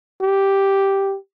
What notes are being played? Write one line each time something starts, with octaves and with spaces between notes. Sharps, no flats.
G4